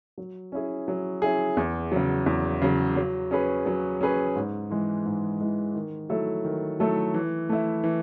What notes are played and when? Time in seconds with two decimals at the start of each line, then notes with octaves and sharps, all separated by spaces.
0.18 F#3
0.52 C#4 E4 G#4
0.88 F#3
1.22 C#4 E4 G#4
1.57 E2
1.92 C#3 F#3
2.26 E2
2.62 C#3 F#3
2.96 F#3
3.31 C#4 G#4 B4
3.66 F#3
4.01 C#4 G#4 B4
4.36 G#2
4.70 E3 G#3
5.06 G#2
5.40 E3 G#3
5.75 D#3
6.10 F#3 A3 E4 A4
6.45 D#3
6.80 F#3 A3 E4 A4
7.14 E3
7.49 A3 E4
7.84 E3